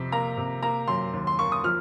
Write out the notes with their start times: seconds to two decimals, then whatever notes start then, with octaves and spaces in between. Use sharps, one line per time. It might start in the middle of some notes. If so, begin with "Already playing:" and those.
Already playing: F2 C3
0.12 A#3 A#5
0.37 C3
0.63 A#3 A#5
0.88 F#2 C6
1.13 D#2
1.27 C6
1.39 A#3 C#6
1.52 D#6
1.63 F3 F6